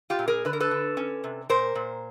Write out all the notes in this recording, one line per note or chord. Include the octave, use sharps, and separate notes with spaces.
F4 G4
A#2
G#4 A#4
D3 B4
A#4
A4 B4
D3
C#4
C3
A#2 A#4 C5
A#2